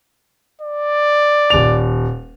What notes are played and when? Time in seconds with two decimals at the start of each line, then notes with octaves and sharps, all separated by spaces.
0.61 D5
1.50 D#1 F7